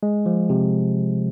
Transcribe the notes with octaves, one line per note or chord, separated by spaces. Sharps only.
G#3
F3
C3